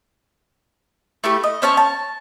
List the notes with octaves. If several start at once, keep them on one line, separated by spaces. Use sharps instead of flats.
A3 E4 G4 C#6
D#5
C4 C#4 C#5 A5
A5